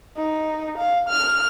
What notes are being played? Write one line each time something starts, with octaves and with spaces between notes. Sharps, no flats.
D#4
F5
F6